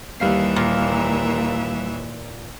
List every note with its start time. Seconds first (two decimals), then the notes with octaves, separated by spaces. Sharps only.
0.20 D#2 E3 G3 E5 F5 C7
0.56 A#2